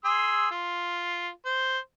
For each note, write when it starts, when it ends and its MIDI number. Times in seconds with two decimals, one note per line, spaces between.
0.05 0.49 68
0.05 0.49 84
0.05 0.49 88
0.51 1.29 65
1.46 1.78 72